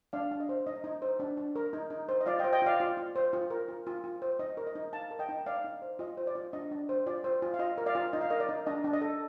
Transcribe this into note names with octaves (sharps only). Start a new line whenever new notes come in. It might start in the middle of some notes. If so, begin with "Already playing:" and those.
D4 D5 F5
D4
D#5
C5
D#4 D#5
D#4
C5
D4
D4
A#4
D#4
D#4
C5
D#5
F4 D5 F5
D#5 G5
C5
D#5 G5
F4 D5 F5
F4 D5
F4
C5
F4
A#4
F4
F4
F4
C5
D#4 D#5
A#4
D#5
D#4
D#4 F5 A5
A#4
D#5 G5
D#4
D#4 D5 F5
D#4
C5
F4 D#5
C5
D5
F4
D4 D#5
D4
C5
F4 D5
C5
F4
F5
F4 D#5
A#4
D5 F5
F4
D#4 D#5
F5
A#4 D#5
D5
D#4
D4 D#5
D4
D#5
A4